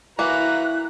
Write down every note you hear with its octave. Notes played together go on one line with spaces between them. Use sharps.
E3 A#3 E4 F#4 B4 A#5 F#6